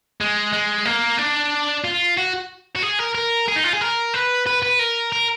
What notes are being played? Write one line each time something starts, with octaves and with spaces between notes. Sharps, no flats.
G#3
G#3
A#3
D4
F4
F#4
F#4
G#4
A#4
A#4
G#4
D#4
F4
G#4
A#4
B4
B4
B4
A#4
A#4